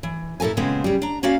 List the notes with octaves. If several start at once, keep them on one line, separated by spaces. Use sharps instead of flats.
E3
A#2 E4 A4 A#4 G#5
A#2 C#3 G#3 B3 C4
C#3 G3
D4 A#5
A#3 C#4 F#4 D5 F5